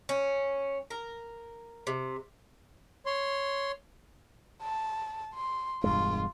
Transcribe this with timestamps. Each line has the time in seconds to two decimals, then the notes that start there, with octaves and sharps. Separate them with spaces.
0.09 C#4
0.90 A#4
1.87 C3
3.06 C#5 C6
4.62 A5
5.34 C6
5.84 E1 G2 G#3 F4